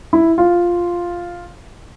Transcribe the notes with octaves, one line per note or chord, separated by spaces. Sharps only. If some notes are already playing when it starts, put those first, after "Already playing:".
E4
F4